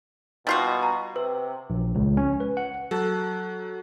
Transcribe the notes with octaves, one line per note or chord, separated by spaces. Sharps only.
B2 G3 F4 F#4 A6 C7
A#5
C3 B4
A#1
C#2
C#4
B4
F#5
F#3 A4 F#6